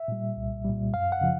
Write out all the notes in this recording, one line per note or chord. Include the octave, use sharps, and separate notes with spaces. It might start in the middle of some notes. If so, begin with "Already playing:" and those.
Already playing: E5
A#2 G3
C2
A#2 G3
F#2 F5
F#5
C#3 F3